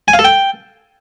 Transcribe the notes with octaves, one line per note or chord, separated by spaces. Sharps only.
G#5
F5
A4
G5